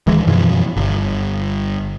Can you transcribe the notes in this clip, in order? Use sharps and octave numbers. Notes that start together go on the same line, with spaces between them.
D1 D#3 E3 G#3
F#2 B2 E3 F3
G1